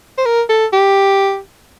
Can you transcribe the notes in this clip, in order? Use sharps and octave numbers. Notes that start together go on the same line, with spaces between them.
C5
A#4
A4
G4